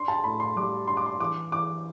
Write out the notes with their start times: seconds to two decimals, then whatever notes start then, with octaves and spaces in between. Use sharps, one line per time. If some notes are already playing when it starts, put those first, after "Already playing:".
Already playing: D4 C6
0.08 A5
0.24 A2 B5
0.40 C6
0.56 G3 D6
0.88 D4 C6
0.97 D6
1.06 C6
1.19 E3 D6
1.51 E3 D6